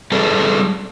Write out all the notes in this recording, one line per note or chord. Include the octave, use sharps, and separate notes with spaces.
G3 G#4 A4 B4 D5